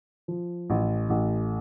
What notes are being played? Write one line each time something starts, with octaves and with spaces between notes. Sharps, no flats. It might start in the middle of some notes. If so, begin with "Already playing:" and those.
F3
A1
A1